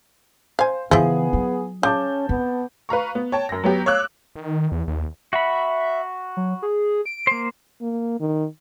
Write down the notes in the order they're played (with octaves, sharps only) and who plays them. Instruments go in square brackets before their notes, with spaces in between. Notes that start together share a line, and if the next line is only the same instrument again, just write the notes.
[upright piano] C5 [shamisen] F5 G#5
[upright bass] C#3 E3 [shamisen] F3 E4 [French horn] B3 [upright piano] G#4
[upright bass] F#3 F4
[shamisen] C#3 [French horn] C#4 [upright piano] A5 D6 G6
[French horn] B3 [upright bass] C4
[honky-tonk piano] B4 F5 A#5 C#6
B3
C#5 G5 A5
F#2 A#6
F#3 B3 G4
C#5 F5 D6 E6 F#6
[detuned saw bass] D#3
E2
D#2
[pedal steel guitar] F#4 F#5 B5 [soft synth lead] E5
[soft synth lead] F#3
G#4
D7
[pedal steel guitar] A#3 C5
[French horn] A#3
D#3